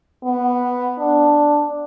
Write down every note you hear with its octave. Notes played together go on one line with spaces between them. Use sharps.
B3
D4